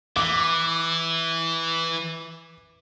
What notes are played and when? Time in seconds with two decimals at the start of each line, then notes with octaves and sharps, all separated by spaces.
0.16 E3 D6